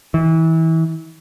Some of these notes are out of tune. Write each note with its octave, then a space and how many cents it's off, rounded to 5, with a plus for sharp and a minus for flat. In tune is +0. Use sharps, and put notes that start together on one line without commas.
E3 -30